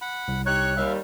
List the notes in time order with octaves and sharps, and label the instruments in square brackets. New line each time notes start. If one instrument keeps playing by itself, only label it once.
[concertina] F#5 B5
[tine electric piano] C2
[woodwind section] D#4 G4 C#5 [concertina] C#6 [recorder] F#6
[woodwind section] D#2 G3 [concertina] E5 F5